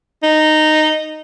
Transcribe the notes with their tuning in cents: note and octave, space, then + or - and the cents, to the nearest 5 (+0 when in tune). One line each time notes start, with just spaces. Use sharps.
D#4 -10